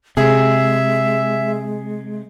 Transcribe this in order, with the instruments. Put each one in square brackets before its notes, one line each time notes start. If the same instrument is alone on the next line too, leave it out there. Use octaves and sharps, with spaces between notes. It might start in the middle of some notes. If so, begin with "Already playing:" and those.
[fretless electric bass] C3 [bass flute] G#3 [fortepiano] G#4 [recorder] E5